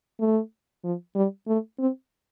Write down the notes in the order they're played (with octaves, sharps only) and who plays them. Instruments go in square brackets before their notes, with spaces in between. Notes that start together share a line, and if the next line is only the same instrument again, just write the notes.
[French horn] A3
F3
G3
A3
C4